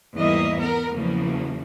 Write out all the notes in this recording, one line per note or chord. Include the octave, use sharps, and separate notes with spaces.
E2 G#2 G3 A#3 D#5 E5
B3 A#4
E2 C#3 F3 F#3 A#3